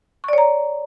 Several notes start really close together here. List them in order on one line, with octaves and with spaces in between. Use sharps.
C#6 D5 C#5 A#5